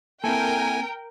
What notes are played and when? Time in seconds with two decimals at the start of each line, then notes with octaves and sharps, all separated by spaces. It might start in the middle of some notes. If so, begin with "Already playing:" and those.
0.24 A#3 C4 E4 A4 A#4 G5 G#5